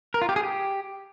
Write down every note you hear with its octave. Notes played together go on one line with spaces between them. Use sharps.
A#4
F4
G4
G#4
G4